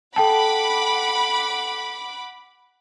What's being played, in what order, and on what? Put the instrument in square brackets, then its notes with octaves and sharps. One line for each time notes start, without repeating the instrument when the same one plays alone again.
[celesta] A4 G5 A5 [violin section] F#5 B5 D6